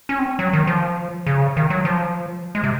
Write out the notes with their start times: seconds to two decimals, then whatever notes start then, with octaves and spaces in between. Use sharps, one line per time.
0.09 C#4
0.19 C4
0.39 F#3
0.53 D#3
0.67 F3
1.26 C#3
1.57 D#3
1.70 F#3
1.85 F3
2.55 G#3
2.63 C3